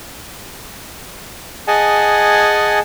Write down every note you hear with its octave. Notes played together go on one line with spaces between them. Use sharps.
G#4 D#5 F#5 G#5 A5